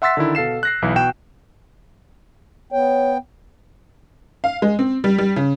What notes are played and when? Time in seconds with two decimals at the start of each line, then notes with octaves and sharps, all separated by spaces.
0.02 E5 F#5 C6 E6 A6 B6
0.17 D3 D#3 E4
0.35 B2 A4 F5 C7 E7
0.63 F#6 A#6 C7
0.82 B1 E3 E4
0.96 B2 F#4 G5 F#6 E7
2.73 B3 C#5 G5
4.44 F5
4.62 G#3
4.79 C4
5.04 G3
5.18 G3
5.36 C#3